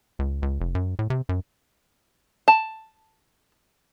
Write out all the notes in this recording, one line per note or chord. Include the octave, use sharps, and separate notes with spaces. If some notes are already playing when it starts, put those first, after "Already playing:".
C#2
C#2
F1
F#2
A2
C3
F#2
A5